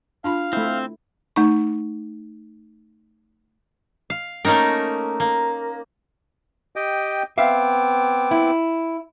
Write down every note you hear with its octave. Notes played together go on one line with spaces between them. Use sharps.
D4 F4 F5 B5
A3 C4 E4
A3 D#4 C#6
F5
A3 A#3 C#4 D#4 A#4
A#3
G4 D#5 G5
B3 C4 E5 F5 D6
E4